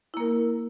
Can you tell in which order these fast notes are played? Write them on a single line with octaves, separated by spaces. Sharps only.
E4 A#3 A#4